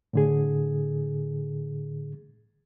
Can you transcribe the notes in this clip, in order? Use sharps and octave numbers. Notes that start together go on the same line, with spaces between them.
A2 D3 G#4